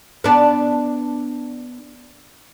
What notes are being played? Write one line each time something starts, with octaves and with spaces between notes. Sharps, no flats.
B3 D4